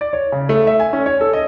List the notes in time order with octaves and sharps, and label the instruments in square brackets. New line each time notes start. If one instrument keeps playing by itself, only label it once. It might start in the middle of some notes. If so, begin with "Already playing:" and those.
[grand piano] D5
C#5
C#3
A3
E5
G#5
C#4
C#5
A4
D#5